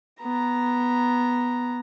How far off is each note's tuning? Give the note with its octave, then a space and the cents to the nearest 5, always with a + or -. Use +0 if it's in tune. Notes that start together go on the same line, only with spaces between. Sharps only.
B3 +0 A#5 +0